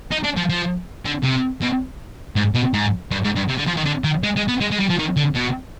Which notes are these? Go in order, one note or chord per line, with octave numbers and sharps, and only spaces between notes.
D#4
D4
F3
F3
D3
C3
B2
G#2
B2
G#2
G2
G#2
G2
C3
D3
F3
D#3
D3
D#3
G#3
G#3
B3
G#3
G#3
G3
F3
D#3
D3
B2